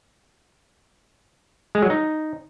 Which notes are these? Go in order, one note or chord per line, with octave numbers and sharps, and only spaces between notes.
G#3
F#3
D#4